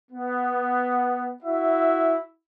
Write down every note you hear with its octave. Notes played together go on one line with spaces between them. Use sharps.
B3
E4 F#4 E5